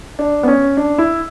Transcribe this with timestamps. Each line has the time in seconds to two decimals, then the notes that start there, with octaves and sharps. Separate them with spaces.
0.19 D4
0.43 B3
0.48 C#4
0.77 D4
0.98 E4